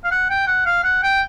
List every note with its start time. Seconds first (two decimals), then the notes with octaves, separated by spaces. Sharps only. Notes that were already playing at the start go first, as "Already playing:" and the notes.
0.04 F5
0.11 F#5
0.30 G5
0.47 F#5
0.66 F5
0.84 F#5
1.03 G5